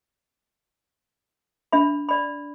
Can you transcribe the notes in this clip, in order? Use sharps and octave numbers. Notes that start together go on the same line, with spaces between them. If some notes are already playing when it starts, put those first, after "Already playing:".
D4 E5 B5
D5 B5